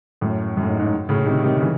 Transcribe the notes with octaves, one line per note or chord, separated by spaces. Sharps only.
F#2 A2
F#2
A2
G#2
G#2
A2 C#3
C3 D#3
C3 D#3
C#3 E3